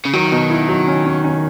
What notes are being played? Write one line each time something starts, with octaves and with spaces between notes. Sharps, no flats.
C#3
D#3 F#3
B2
E4
F#3
C#4
C#4
C#4